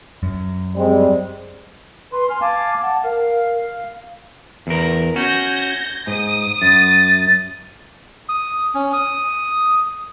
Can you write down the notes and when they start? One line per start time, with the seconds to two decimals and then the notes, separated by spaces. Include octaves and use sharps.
0.23 F#2
0.75 G3 G#3 C4
2.12 B4 C6
2.30 G#5 C6 F6
2.41 F5 G#5 A5 D6
2.82 F#5 A5
3.04 A#4 F5
4.67 E2 A#4
5.16 C#4 F#4 G6 G#6 A#6
6.07 G#2 D#6
6.62 F#2 A6
8.29 D#6
8.75 C#4
8.93 D#6